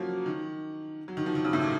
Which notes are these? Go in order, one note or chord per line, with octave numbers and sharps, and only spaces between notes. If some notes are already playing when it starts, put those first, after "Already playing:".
Already playing: F3 F#3 A#3 C#4
D#3
F#3
D#3
F3
D#3
C#3
A2
A#2